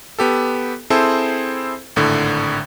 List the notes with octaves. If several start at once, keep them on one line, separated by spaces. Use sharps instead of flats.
B3 G4 A4
C4 E4 G#4 A4 C5
G#1 A2 D3